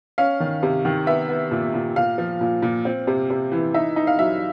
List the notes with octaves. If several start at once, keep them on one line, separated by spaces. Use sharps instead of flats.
C#4 F5
D#3
C3
D#3
B3 E5
B3
A#2
A#2
A#2 F5
F3
A#2
A#2
C4
C3
C3
E3
D#4 E5
D#4
F5
F#3 E5